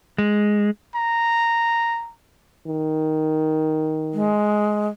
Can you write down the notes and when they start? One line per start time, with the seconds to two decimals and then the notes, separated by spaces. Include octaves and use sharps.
0.18 G#3
0.95 A#5
2.67 D#3
4.13 G#3